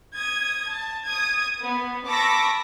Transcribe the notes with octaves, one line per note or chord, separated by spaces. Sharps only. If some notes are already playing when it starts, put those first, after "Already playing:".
D#6 G#6
A5
D#6 G#6
B3
A5 B5 C#6 D6 E6 A#6